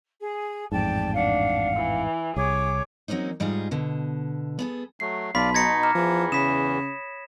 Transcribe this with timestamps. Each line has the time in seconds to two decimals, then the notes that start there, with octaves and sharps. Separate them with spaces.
0.20 G#4
0.72 A1 F2 G#2 D5 G5 A5
1.15 D4 F5 F#5
1.76 E3
2.36 C2 G#4 C#5 D6
3.08 F#3 A#3 C4 C#4 D#4
3.40 G#2 G3 D#4 F4 G#4
3.71 B2 D3
4.59 B3 G#4 A4
5.00 F#3 A3 C7
5.35 B1 D5 F5 A5 B5 C6 B6
5.54 B2 D#4 G#6 A#6 C#7
5.83 A#5 D6 F6
5.95 E2 E3 F3
6.32 C#3 C#5 B5 D#6 B6 E7